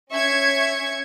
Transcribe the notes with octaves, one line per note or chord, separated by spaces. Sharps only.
C#4 E5 C#6 G#6